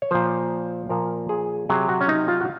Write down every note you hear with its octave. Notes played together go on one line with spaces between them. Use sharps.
C#5
A#2 F3 C5
A#2 F3 A#4
G#4
C3 F#3 G#4
F#4
C#4
D#4
F4
F#4